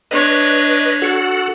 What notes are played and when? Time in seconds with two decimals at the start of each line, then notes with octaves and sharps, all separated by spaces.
0.11 D4 B4 C#5 D#5
1.02 F#4 A4 F#5